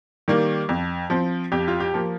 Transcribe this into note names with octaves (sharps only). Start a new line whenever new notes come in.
D#3 G3 A#3
F2
F3 C4
F2 G4
F4
G4
F3 A#3